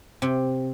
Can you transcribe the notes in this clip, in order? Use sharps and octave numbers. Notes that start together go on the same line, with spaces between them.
C3